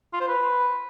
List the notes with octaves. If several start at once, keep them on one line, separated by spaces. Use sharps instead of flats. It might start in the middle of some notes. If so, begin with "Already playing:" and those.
F4
C5
B4